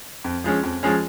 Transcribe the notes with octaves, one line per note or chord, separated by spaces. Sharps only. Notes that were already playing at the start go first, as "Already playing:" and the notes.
F2
F3 G#3 C#4
F2
F3 G#3 C#4